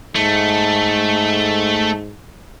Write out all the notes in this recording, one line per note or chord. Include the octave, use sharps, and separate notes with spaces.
G#2 A3